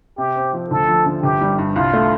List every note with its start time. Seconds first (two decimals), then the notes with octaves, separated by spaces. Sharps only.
0.18 C3 G4
0.36 C4
0.53 F3
0.70 D2 A4
0.88 F3
1.06 D3
1.23 G1 G4
1.41 G3
1.58 G2
1.76 C2 F4
1.93 A3